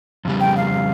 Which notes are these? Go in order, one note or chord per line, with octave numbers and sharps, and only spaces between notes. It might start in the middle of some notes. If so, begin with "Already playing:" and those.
F2 C#3 G3
G5
F5